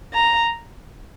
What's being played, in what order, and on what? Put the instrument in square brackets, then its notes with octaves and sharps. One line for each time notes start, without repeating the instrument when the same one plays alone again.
[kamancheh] A#5